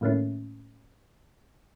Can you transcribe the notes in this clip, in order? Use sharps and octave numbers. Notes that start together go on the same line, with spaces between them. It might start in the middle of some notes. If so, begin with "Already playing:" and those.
A2 D#3 A3 A#3 C#4 E4